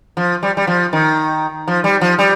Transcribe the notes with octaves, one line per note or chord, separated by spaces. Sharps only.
F3
G3
G3
F3
D#3
F3
G3
F3
G3